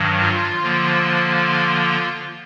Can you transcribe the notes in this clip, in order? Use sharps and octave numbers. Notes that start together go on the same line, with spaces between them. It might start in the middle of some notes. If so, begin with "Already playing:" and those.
Already playing: G2 D#3 F#3
F4
D3 F3 A#3